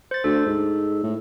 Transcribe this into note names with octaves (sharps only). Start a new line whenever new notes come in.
C5 A6
D2 A4
G#2
A2